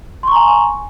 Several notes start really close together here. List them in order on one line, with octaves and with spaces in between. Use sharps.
C6 C#6 A#5 G#5